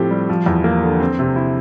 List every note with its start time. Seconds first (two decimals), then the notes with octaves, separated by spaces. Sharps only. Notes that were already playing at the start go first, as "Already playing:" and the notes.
Already playing: A2 F3 C4 G4
0.10 G3
0.29 F3
0.46 E2
0.64 A#3
0.83 D3
1.00 C4
1.19 C3
1.36 E4